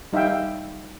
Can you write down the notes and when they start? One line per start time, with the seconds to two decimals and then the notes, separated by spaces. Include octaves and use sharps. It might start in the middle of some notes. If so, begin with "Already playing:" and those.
0.13 G3 D#4 E5 F5 G5